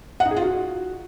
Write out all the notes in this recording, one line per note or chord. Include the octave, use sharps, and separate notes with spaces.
F#5
D#4
G#4
F4
F#4